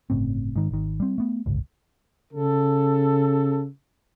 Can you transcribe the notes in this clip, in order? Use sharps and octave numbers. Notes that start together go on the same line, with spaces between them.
G1 A2 C#3 C4
G#2 D#3
G#1 D#3
G3 C4
A3 B3
D1 G1 C#2
C#3 A4